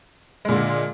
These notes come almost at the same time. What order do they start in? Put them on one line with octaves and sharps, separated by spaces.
G#3 A#2 D3